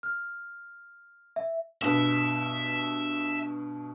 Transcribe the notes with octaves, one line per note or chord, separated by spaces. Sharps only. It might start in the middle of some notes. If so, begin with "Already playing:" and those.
F6
E5
G2 B2 B4 E5